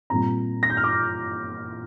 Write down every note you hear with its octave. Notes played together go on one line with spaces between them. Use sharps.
A#2 G3 C4 A#5
A#6
G6
F6
D6